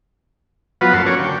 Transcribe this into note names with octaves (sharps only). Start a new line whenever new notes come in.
F3 F#3 B3 F4 F#4 B4
F#2 A#3 A4 F#5 C6
C#4 F#4 A#4 C#5 D5
D3 G5